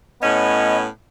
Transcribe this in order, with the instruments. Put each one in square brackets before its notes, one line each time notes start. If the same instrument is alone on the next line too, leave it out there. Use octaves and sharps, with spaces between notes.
[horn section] A2 B3 C#4 [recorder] D#5